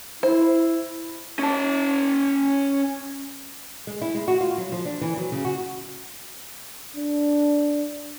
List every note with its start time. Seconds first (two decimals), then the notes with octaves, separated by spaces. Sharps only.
0.23 E4 C5
1.39 C#4 A5
3.87 G#3
4.02 E4
4.15 G#3
4.28 F#4
4.41 F4
4.58 F#3
4.72 F3
4.85 D4
5.01 E3
5.17 F#3
5.32 C#3
5.45 F#4
6.96 D4